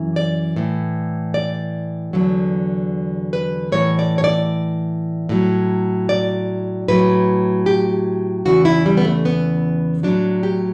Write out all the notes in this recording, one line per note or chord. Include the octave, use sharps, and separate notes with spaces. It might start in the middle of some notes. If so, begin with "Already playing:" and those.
Already playing: F#2 E3
D5
A2 E3
D5
E2 D3 F#3
B4
A2 E3 C#5
D5
C#5
D5
A2 F#3
D5
A2 F#3 B4
G4
E2 C#3 E3 F#4
E4
G3
B3
A3
B3
A2 F#3 D4
G4